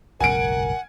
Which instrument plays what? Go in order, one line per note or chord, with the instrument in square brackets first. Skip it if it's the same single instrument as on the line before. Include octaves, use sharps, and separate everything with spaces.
[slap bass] F#1 B1 G#2 [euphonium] A#4 [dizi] F#5 [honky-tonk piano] G#5 D7